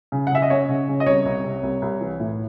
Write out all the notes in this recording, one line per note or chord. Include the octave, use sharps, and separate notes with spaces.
C#3
F#5
C#3 E5
D#5
C#4 C#5
C#3
C#3
D#5
C2 C#5
C2
C3
C2
C2
E3
A2